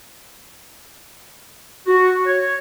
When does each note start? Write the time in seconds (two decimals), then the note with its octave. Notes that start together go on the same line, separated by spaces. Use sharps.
1.86 F#4
2.26 C#5